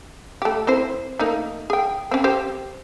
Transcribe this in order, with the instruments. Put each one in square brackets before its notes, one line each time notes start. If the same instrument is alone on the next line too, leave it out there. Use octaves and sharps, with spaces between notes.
[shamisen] A3 G4
C4 E4 C5
A3 A#3 D#4
G#4 G5
C4 C#4
G4 C5